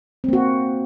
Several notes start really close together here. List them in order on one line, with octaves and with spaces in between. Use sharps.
C4 A#3 F#4